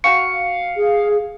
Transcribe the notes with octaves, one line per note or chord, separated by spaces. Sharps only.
F#4 F5 G5 C#6 C#7
G#4